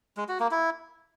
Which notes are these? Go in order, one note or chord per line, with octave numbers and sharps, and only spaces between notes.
G#3
F#4
A#3
E4